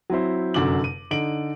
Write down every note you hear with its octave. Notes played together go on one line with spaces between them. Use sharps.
F#3 C4 E4 C5
F1 F#2 D3 D6 F#7
D#7
D3 D#4 D7 F#7